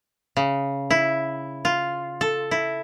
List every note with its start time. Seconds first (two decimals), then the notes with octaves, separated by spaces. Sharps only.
0.37 C#3
0.90 E4
1.65 F4
2.21 A4
2.51 E4